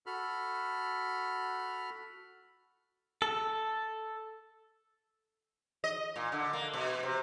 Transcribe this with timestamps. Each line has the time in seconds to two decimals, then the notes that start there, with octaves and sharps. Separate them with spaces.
0.06 F#4 A4 B5 F6
3.22 A4
5.84 D#5
6.16 A#2
6.32 D3
6.53 A#3
6.74 B2
7.03 C3